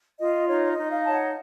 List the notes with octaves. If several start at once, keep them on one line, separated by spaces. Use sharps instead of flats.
F4 D#5
D#4 C#5
D#5
D#4
F5
C#5 A5
F#5